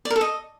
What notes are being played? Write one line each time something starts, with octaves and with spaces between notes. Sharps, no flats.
D5
A#4
A4
D#5